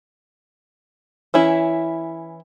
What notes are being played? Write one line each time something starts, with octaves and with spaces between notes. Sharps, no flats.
E3 C#4 E4